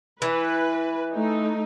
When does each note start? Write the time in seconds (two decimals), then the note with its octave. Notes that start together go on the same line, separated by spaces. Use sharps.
0.22 E3 B4
1.13 A3 D#4